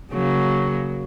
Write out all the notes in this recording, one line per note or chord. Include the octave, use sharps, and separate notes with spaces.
C#3 F#3 A#3